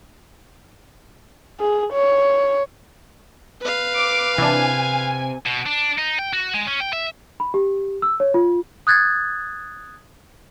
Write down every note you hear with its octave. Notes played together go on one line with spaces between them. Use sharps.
G#4
C#5
B4 F5
D6
C3 E3 C4 D4 G#5
B2
D4
D#4
G5
F#4
G#3
C#4
G5
E5
B5
G4
E6
C#5
F4
D#6 F#6 G#6 A6